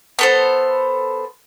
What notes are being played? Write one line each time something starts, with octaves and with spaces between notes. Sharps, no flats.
B3 A4 C5